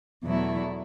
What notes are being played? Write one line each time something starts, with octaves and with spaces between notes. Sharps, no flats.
E2 B2 F#3 A3 E4